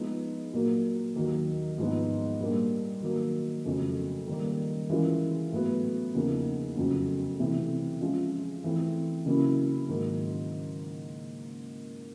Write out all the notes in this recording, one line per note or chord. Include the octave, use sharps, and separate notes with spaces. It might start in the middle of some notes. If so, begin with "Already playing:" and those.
Already playing: F3 G#3 B3 D#4
A#2 F#3 A#3
D#2 D#3 F#3 A#3
G#2 F3 G#3 B3 D#4
A#2 G3 A#3 D4
D#3 F#3 A#3
F2 C#3 F#3 A3 C#4
D#3 G3 A#3
E3 G#3 C#4 F4 A#4
A2 F#3 B3
E2 C#3 F3 A#3 D#4
F2 C#3 F#3 A3 C#4
C3 E3 A3 C4
F3 G#3 C#4 F4
E3 A3 C4
C#3 F#3 A#3 C#4 E4
G#2 D#3 F#3 A#3